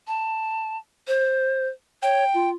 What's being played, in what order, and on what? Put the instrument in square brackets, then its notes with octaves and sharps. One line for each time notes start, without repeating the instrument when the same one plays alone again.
[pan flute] A5
C5
[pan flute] C#5 [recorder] G5
[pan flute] F4